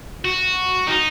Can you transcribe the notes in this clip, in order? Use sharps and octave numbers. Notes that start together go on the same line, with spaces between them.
F#4
D#4